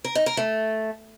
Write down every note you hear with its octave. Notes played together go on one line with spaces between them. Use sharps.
A#4
D#4
A#4
A3